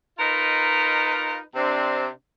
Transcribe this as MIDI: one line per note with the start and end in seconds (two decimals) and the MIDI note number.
0.19 1.38 63
0.19 1.38 65
0.19 1.38 70
0.19 1.38 71
0.19 1.38 75
1.55 2.06 48
1.55 2.06 60
1.55 2.06 62